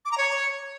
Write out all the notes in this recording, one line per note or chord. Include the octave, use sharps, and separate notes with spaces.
D6
A#5
C#5